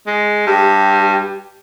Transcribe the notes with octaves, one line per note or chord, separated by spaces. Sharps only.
G#3
G2 G4